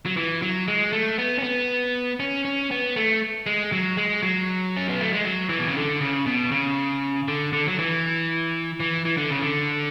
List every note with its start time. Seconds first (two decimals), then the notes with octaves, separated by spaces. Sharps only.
0.06 F#3
0.17 E3
0.42 F#3
0.68 G#3
0.93 A3
1.18 B3
1.38 C#4
1.43 B3
2.20 C#4
2.45 C#4
2.71 B3
2.96 A3
3.46 G#3
3.72 F#3
3.97 G#3
4.23 F#3
4.77 C#4
4.89 B3
5.01 A3
5.13 G#3
5.24 F#3
5.49 E3
5.59 B2
5.67 C#3
5.76 D3
6.01 C#3
6.26 B2
6.52 C#3
7.28 D3
7.53 D3
7.68 F#3
7.79 E3
8.80 E3
9.05 E3
9.17 D3
9.30 C#3
9.42 D3